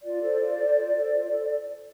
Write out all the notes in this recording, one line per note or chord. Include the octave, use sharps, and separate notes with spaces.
F4 D5
A4 C5
F4
A4 C5
F4
A4 C5
F4
A4 C5